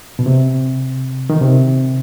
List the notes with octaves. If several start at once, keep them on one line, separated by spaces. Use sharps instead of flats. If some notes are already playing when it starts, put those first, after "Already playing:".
B2
C3
D#3
C3